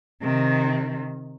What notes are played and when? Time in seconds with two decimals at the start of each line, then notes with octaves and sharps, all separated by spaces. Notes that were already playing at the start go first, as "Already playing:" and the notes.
0.22 C3 D#3